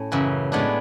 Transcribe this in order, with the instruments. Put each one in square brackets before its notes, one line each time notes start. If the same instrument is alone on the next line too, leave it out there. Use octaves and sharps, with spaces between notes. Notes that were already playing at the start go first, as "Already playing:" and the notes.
Already playing: [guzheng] A2 C#4
F#2 C#3 E3
A2 G#3 B3 D4